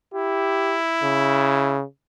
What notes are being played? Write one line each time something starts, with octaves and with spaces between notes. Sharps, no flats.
E4 G4
C#3